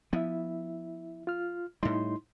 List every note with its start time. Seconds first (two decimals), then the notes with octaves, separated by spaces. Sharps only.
0.13 F3 B3 E4 E5
1.27 F4 F6
1.83 A2 G3 D#4 E4 C6